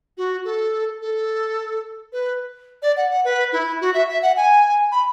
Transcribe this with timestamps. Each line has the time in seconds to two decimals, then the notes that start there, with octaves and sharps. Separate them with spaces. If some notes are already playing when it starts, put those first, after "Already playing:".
0.17 F#4
0.45 A4
1.02 A4
2.12 B4
2.82 D5
2.97 F#5
3.11 F#5
3.24 B4
3.53 E4
3.81 F#4
3.94 E5
4.09 E5
4.22 F#5
4.36 G#5
4.92 B5